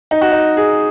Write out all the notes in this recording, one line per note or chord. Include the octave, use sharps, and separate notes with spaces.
D#4
F#4
D#4
G#4